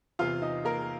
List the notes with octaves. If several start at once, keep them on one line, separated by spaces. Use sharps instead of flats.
E2 C3 E3 F4 F5
D#4 D#5
A#3 A#4